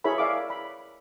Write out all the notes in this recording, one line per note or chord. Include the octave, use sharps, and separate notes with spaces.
E4 G#4 A#4 C#5 E5 B5
D5 E5 F5 D6
B5